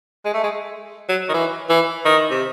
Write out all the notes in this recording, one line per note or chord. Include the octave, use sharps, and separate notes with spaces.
G#3
A3
G#3
F#3
D#3
E3
E3
D#3
C3